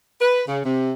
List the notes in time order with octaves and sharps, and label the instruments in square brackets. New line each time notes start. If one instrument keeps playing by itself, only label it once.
[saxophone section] B4
C#3
C3